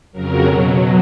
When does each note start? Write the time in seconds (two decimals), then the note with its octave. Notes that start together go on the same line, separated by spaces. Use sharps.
0.12 F2 C#3 F#3 A#4
0.45 B2 F#3 A4